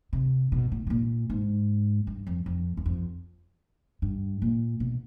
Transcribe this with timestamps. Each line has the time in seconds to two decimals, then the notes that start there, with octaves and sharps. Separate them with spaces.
0.13 C3
0.52 B2
0.72 A2
0.87 B2
0.90 A#2
1.30 G#2
2.07 G2
2.27 F2
2.46 F2
2.77 E2
2.86 F2
4.02 G2
4.42 A#2
4.80 B2